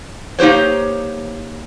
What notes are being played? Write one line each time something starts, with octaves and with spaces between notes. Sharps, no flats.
A#3 D#4 G4 C5 C#5